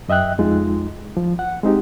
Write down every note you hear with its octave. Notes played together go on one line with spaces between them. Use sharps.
F#2 D#5 E5 G5 F#6
F2 G#3 D#4 F4
F3
F#5
G#3 C4 D#4 G4